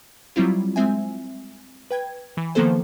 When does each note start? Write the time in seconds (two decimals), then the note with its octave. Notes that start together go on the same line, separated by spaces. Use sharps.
0.36 F#3 G3 C4 E4 F4
0.76 G#3 C4 E5 G#5
1.91 B4 G5 G#6
2.37 E3
2.55 D#3 F3 A#3 B3 A4 C5